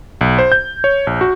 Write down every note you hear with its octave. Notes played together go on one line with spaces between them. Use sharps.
B1
C5
G6
C#5
A#1
F#4